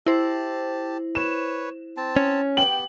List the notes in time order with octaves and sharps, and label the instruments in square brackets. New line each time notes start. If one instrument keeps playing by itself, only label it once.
[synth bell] E4 C5 [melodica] G4 A5
[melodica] B4 C#5 [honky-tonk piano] E7
[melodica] C4 A5
[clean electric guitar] C#4
[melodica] B3 G4 [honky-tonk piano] G5 F#7